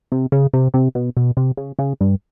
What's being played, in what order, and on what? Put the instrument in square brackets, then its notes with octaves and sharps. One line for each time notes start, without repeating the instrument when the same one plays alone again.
[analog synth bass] C3
C#3
C3
C3
B2
B2
C3
C#3
C#3
G2